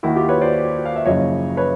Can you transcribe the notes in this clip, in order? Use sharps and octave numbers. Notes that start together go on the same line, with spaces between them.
D#2 D#3 E4 F#4
F4 G4
B4 C#5
C5 D5
F5
E5
F#1 F#2 C#3 F3 C#5 D#5
B4 C#5